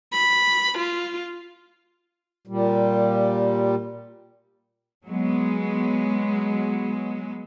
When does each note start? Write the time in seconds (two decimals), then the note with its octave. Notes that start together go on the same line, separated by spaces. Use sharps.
0.12 B5
0.78 F4
2.47 A#2 G3
5.06 F#3 G#3 B3